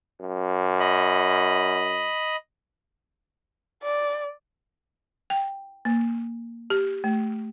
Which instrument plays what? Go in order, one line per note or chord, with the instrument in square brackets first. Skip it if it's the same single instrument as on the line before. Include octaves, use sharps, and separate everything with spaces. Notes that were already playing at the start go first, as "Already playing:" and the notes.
[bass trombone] F#2
[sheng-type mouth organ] D#5 B5
[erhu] D5
[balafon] G5
A#3
G4
A3